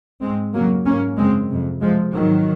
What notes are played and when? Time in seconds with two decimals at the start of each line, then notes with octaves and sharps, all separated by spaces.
0.22 G#2 G#3 C4
0.54 F2 C#3 F#3 A#3
0.86 G#2 A#3 C#4
1.18 F#2 C#3 G#3 C4
1.50 F2 C3
1.81 F2 C3 F3 G#3
2.13 G#2 D#3 F#3